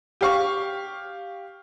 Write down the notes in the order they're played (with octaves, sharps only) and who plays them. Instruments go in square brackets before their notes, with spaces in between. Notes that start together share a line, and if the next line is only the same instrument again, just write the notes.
[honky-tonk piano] G4 F5 C#6